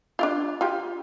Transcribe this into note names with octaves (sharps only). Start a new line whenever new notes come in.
D4 E4 F4
F4 G4